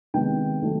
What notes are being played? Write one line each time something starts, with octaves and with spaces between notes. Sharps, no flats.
C3 D#3 G#3 B3 G5
D#3 F#3 A3